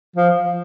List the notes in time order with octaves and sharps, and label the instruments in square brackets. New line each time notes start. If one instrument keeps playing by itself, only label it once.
[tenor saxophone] F3